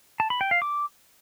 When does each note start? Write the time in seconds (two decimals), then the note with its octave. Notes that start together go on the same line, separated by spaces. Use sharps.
0.20 A5
0.30 B5
0.41 G5
0.51 F5
0.62 D6